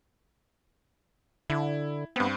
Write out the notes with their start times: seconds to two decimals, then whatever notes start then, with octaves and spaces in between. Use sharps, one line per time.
1.50 D3 E4
2.16 G2 B3 C4